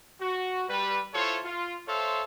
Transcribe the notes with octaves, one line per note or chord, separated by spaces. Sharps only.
F#4
G3 B4
E4 F4 A4 C5 C#5
F4
A4 C5 C#5 E5 F5 C6